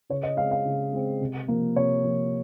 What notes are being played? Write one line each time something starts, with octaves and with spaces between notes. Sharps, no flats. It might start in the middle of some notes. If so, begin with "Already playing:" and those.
C#3 C#5
D#5
G#3 C4 F5
F5
C#3
G#3 C4
C3
F3 A#3
C3 C#5
F3 A#3